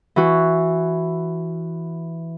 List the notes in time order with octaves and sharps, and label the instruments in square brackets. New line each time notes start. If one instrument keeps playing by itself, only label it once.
[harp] E3 F#4